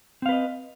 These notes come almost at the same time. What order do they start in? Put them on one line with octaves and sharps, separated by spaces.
C4 F5 B4 D#5